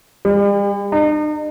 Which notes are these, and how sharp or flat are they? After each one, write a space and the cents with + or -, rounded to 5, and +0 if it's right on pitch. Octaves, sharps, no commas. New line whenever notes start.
G3 +45
D#4 -45